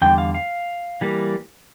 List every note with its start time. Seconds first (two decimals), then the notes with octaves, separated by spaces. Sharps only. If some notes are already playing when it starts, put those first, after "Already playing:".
0.02 E2 D3 G3 G5
0.18 F5
0.34 F5
1.01 E3 G3 A#3